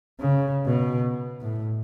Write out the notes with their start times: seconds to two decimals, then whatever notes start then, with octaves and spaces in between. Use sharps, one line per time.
0.20 C#3
0.66 B2
1.41 A2